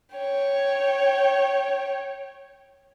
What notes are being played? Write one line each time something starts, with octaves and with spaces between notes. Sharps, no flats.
C#5 G5